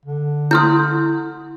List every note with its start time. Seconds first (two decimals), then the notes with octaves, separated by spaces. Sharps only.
0.06 D3
0.51 E4 C6 D#6 F6 G6